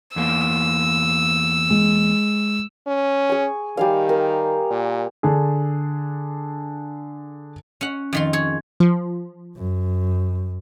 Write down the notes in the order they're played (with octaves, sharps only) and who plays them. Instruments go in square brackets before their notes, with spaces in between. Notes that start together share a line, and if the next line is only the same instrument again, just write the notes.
[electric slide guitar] E2 A#3 [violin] E6
[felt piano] G#3
[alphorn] C#4
[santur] G#4 C#6
[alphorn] D#3 [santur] G3 G#4 F5
[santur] A#4
[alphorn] A#2
[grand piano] D3 D4 G#4
[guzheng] C#4 F#5
F2 D#3 F4
G#4 C#5
[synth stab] F3
[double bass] F#2